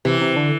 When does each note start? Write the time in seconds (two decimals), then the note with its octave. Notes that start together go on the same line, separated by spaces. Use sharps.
0.05 C3 E3
0.21 C3
0.36 D3